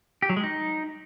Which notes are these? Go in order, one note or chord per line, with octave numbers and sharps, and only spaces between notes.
G4
F#3
G#3
D#4